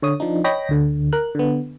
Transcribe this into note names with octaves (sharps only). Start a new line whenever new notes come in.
D3 C#5 D#6
F3 D4 D#4
C#5 D#5 G5 B5 A#6
D2 D3
A#4 F#6
D3 B3